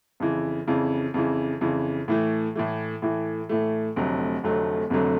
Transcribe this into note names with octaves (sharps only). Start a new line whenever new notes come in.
F2 C#3 E3
F2 C#3 E3
F2 C#3 E3
F2 C#3 E3
A2 E3 A3
A2 E3 A3
A2 E3 A3
A2 E3 A3
F1 F2 D3 F#3 A3
F1 F2 D3 F#3 A3
F1 F2 D3 F#3 A3